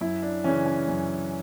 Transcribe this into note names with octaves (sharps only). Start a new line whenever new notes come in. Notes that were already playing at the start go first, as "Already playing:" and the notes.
F#2 E4
D4
C#3 E3 C#4
C#4
F#2